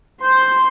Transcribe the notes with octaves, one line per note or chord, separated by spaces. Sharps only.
C5 C6